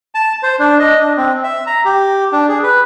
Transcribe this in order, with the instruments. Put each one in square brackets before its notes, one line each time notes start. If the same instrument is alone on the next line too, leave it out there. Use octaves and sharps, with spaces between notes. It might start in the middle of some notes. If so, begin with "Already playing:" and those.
[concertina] A5
C5
D4
D#5
D4
C4
E5
A#5
G4
D4
G#4
B4